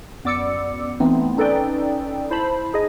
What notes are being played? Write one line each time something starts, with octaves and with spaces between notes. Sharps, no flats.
F#2 B3 D5 D6 E6 C#7
E3 A3 B3 C4 D#4
C#4 D#4 A4 B4 D5 G5
E4 C5 A5 B5
D#4 G#4 D#5